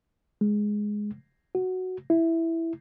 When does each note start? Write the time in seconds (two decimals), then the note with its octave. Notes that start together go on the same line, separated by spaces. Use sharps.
0.41 G#3
1.55 F#4
2.10 E4